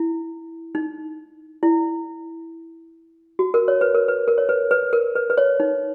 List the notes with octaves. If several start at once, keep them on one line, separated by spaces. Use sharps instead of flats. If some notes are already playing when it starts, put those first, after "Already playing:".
Already playing: E4
D#4
E4
F#4
A#4
C#5
B4
A#4
B4
A#4
C#5
B4
B4
A#4
B4
B4
C#5
D#4